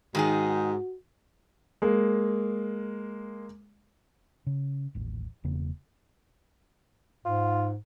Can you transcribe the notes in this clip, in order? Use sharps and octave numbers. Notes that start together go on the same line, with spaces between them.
G#2 D#3 D#4 F#4 G#4
G#3 A#3
C#3
D#1 A1
E1 E2 C#3 A#3
G#2 F4